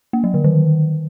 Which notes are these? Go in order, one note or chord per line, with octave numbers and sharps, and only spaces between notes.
A#3
F#3
D3
D#3